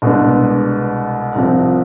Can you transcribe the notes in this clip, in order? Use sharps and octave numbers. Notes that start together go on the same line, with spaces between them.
C2 B2 G#3 B3 D4
C2 C3 F3